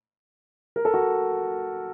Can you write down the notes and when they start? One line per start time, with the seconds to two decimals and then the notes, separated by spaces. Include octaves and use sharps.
0.76 A#4
0.85 A4
0.94 F#4